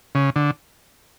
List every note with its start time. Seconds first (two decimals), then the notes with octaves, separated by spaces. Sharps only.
0.15 C#3
0.36 D3